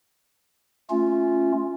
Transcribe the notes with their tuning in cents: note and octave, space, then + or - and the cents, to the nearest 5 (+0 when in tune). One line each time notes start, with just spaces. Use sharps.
A3 +0 C#4 +0 F4 +0